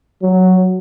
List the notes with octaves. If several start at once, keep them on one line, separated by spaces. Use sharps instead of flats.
F#3